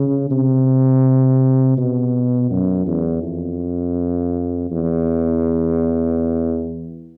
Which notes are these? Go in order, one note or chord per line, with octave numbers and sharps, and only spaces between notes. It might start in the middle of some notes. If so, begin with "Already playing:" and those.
Already playing: C#3
C3
B2
F#2
E2
F2
E2